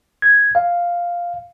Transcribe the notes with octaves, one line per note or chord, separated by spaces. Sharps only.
G#6
F5